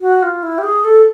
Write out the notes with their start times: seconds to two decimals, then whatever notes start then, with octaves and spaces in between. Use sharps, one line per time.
0.01 F#4
0.23 F4
0.43 E4
0.58 G4
0.63 G#4
0.84 A4